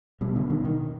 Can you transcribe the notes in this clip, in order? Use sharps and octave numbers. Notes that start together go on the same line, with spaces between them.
B2 G3
D3
D#3
D#3